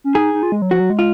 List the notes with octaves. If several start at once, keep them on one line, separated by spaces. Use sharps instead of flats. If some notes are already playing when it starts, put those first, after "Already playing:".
C#4
D#4 G#4
D#4
F4
G#3
F#3
F3 F#4
F#3
G#3
F4